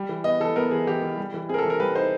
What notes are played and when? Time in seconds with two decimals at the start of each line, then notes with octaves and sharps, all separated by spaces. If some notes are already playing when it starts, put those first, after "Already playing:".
Already playing: G3
0.09 E3
0.24 B3 D#5
0.40 E3 A4
0.56 B3 A#4
0.71 E3 G#4
0.87 E3 G4
1.02 E3
1.17 G3
1.34 E3
1.49 C4 G#4
1.54 A#4
1.58 A4
1.64 E3
1.70 A#4
1.80 G3 B4
1.95 D#4 C5